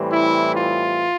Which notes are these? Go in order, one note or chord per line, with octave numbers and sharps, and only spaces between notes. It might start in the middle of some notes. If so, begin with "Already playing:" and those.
Already playing: A2 E3 G3 C4
E4
F4